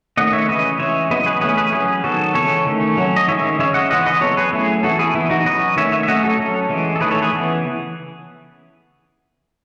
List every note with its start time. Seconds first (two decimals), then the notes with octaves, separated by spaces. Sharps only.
0.17 D#3 A3 C#4 D#5 F#5
0.33 C#5 E5
0.48 C#3 E3 G#3 C#4 B4 D#5
0.79 E3 G#3 C#4 C#5 E5
1.10 C#3 F#3 B3 B4 D#5
1.26 G#4 B4
1.41 E3 A3 C#4 G#4 B4
1.57 G#4 B4
1.72 F#3 C#4 G#4 B4
2.04 D#3 F#3 B3 F#4 A4
2.34 C#3 E3 G#3 C#4 A4 C#5
2.67 D#3 A3 C#4
2.97 F#3 C#4
3.16 D#5
3.28 D#3 G#3 C#4 C#5 E5
3.59 C#3 G#3 C#4 C#5 E5
3.74 D#5 F#5
3.90 E3 G#3 B3 D#5 F#5
4.06 B4 D#5
4.21 F#3 B3 A4 C#5
4.37 G#4 B4
4.52 F#3 A3 C#4 E4 G#4
4.83 E3 B3 F#4 A4
4.99 E4 G#4
5.14 E3 B3 E4
5.30 D#4 F#4
5.45 F#3 C#4 B4 D#5
5.76 D#3 A3 C#4 C#5 E5
5.92 C#5 E5
6.03 E5
6.08 F#3 A3 C#4 D#5 F#5
6.24 F#4 A4
6.39 F#3 C#4
6.69 E3 G#3 C#4
6.96 A4
7.01 D#3 A3 C#4 G#4 B4
7.11 A4 C#5
7.22 G#4 B4
7.32 C#3 E3 B3